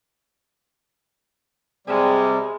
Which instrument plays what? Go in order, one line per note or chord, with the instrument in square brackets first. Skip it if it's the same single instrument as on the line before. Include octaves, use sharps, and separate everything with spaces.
[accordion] C3 G3 [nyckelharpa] G#3